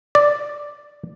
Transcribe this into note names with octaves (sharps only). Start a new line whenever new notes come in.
D5